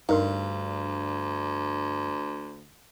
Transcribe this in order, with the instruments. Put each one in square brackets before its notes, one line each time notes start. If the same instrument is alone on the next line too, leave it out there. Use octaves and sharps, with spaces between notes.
[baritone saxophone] D2 [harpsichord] G2 [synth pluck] D#4 A#4 C6